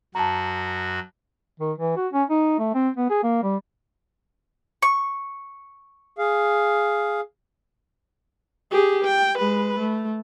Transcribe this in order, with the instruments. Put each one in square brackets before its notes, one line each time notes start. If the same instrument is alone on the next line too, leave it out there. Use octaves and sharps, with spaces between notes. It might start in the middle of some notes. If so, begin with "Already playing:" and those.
[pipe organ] F#2 F#4 [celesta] A5 A#5
[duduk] D#3
E3
F#4
C#4
D#4
A3
C4
B3
G#4
A#3
G3
[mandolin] C#6
[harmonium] G#4 F5
[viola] G4 G#4
G5
G#3 B4
A3